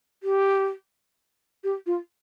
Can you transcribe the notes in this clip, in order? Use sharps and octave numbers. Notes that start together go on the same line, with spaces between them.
G4
G4
F4